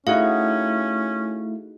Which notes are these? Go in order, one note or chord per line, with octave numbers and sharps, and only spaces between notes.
A3 C#4 D#4 E4 F#4 G#4 F5